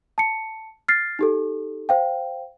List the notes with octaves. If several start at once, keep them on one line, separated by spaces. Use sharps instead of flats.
A5 C#7
F6 A6 C7
D#4 G4 A4
C5 F5 G5